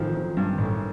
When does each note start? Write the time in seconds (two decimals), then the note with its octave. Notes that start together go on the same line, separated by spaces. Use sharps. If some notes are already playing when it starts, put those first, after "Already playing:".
Already playing: A1 D#3 F3
0.15 F3
0.37 G2
0.58 A1